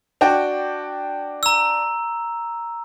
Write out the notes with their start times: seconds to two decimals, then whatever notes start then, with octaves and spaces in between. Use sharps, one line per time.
0.21 D4 F#4 G5
1.43 A#5 E6